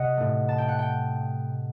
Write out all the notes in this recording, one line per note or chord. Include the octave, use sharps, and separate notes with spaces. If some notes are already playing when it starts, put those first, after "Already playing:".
Already playing: C3 D#5 F#5
A2 A3
A5
G5
F#5
G5